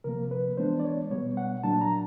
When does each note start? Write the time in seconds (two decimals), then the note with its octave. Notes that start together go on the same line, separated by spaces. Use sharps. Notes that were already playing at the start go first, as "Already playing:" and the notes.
0.04 C3 F3 A#3 A#4
0.31 B4
0.57 E3 G#3 B3 D4 C5
0.80 D5
0.85 C#5
1.11 B2 G3 B3 C#5
1.37 F#5
1.63 A#2 F#3 A#3 D4 A5
1.81 A#5